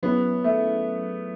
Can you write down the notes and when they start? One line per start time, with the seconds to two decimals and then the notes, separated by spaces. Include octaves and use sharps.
0.03 F#3 B3 C#4 E4 G#4
0.44 A3